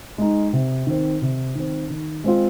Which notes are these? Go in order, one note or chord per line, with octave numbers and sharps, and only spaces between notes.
G#3 D#4
C3
D#3 C4
C3
D#3 C4
D#3
G#3 C4 F4